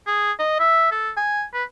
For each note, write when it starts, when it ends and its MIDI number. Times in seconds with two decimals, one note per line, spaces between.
0.07 0.32 68
0.39 0.57 75
0.59 0.90 76
0.92 1.10 69
1.17 1.43 80
1.54 1.64 71